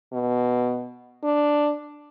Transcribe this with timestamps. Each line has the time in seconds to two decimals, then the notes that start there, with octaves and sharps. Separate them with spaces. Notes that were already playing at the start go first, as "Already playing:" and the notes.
0.13 B2
1.24 D4